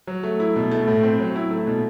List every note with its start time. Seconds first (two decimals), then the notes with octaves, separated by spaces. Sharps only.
0.07 F#3
0.23 A3
0.40 E4
0.56 B2
0.71 A3
0.87 A2
1.03 C4
1.19 F#3
1.36 E4
1.51 A3
1.67 B2